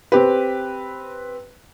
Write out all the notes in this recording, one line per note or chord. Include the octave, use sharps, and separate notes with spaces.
C4 G4 B4